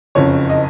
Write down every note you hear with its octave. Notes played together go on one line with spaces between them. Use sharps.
F#1 F2 C#3 C#5
D#5